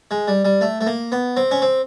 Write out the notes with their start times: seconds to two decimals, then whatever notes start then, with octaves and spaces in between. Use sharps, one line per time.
0.11 G#3
0.28 G3
0.45 G3
0.61 A3
0.81 A3
0.87 A#3
1.12 B3
1.37 C4
1.51 C#4
1.62 C4